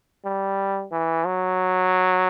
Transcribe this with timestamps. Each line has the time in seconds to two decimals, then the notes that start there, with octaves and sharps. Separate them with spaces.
0.25 G3
0.92 E3
1.26 F#3